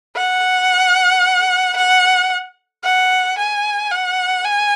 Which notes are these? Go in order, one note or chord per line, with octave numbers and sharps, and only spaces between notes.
F#5
F#5
F#5
G#5
F#5
G#5